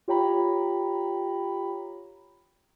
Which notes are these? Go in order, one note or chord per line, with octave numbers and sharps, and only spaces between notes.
F4 G4 C#5 G5 A#5 B5